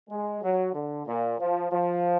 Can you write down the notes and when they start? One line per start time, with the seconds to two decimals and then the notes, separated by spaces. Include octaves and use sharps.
0.09 G#3
0.42 F#3
0.74 D3
1.07 A#2
1.38 F3
1.72 F3